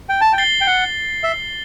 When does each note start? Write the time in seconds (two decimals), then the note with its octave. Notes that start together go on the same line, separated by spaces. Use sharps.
0.09 G5
0.21 A5
0.33 G5
0.38 A6 C7 G7
0.61 G5
0.67 F#5
1.24 E5